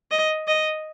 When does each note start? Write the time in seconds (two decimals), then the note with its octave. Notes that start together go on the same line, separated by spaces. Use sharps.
0.11 D#5
0.48 D#5